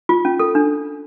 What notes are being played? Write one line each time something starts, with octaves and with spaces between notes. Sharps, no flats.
F4
C#4
A4
D4